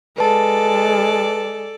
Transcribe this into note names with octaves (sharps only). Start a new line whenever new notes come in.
G#3 A4 B4 D5 A5